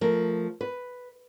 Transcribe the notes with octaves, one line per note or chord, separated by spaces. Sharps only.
F3 A3 A#4
B4